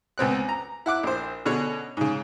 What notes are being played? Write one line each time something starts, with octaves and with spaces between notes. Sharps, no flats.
C#2 B3 C4 F#6
A#5
E4 F#5 D6 F#6
A#1 C5
B2 D3 C#4 G#4 C#5
G#2 C#3